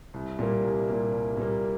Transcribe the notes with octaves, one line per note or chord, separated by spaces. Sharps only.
C2
A#2 G3 A#3
C2
A#2 G3 A#3
C2
A#2 G3 A#3